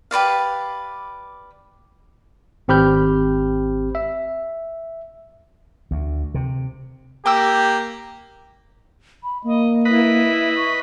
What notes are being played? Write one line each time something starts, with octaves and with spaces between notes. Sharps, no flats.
G4 B4 D5 F5
G#1 C4 G4 B5 F6 G6
E5
D2
C3
A#3 G4 G5 D6 E6
B5
A#3 D#5
E4 B4 D#5 B5
C#6